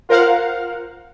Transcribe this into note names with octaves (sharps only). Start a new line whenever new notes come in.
F4 A#4 C5 F5 F#5